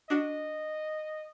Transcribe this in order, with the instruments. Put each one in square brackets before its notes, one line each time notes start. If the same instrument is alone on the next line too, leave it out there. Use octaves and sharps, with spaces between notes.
[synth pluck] D4 F#4 [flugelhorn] D#5